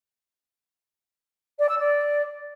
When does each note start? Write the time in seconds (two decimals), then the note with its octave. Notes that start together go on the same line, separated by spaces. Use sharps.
1.59 D5
1.69 E6
1.79 D5